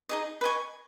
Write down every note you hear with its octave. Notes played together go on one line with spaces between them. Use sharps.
D#4 G#4 D#5
B4
D#5 G#5 C#6